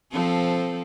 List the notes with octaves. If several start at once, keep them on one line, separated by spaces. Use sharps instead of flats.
F3 C4 A4